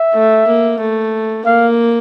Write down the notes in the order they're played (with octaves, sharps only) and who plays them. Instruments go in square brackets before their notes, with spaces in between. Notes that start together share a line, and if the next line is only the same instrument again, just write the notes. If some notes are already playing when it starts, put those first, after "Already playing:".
Already playing: [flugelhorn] E5
[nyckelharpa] A3
A#3
A3
[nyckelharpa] A#3 [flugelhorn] F5